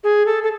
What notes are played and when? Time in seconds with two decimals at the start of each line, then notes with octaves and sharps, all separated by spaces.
0.04 G#4
0.26 A4
0.43 A4